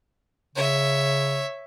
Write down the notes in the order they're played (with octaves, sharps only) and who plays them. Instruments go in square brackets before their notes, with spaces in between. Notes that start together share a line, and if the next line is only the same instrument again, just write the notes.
[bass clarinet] C#3 [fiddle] C#5 E5